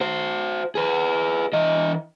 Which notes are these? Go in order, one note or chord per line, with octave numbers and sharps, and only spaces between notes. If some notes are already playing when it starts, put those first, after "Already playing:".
F#4 C5
G#4 B4
E3 D#5